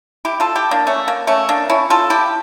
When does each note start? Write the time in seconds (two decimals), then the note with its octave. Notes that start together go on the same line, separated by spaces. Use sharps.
0.25 E4 G4
0.40 F4 A4
0.55 E4 G4
0.71 A#3 D4
0.87 A3 C#4
1.08 A#3
1.27 A3 C#4
1.49 A#3 D4
1.69 C#4 E4
1.90 F4 A4
2.10 E4 G4